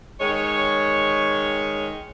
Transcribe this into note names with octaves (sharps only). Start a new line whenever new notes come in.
D#3 G#3 C#5